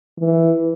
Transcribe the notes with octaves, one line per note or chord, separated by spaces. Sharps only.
E3